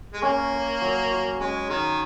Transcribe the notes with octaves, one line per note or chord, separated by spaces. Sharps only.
G#3
A#3 C#4
C#5
F#3
F#4
G#3 C#4
D#3 C#5